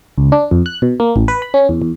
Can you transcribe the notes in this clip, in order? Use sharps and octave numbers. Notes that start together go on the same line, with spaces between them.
C#2
D4
F2
F#6
B2
A#3
A1
B4
B5
C#4
E2
E2